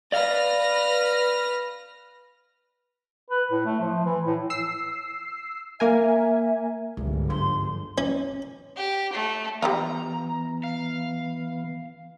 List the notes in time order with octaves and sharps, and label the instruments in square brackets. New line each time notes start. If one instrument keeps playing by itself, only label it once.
[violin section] B4 F6 A#6 [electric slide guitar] D5 F5
[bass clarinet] B4
A2
A3
F3
E3
A2
[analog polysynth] E6 C7
[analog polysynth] A#3 A#4 G#5 [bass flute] E5
[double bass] G1 G#2 [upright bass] C#2
[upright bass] F3 D4 [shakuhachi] C6
[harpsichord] C#4
[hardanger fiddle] G4
A3
[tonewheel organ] E3 B3 [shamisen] G3 D#4 F4 [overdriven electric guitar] A#5
[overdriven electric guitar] F5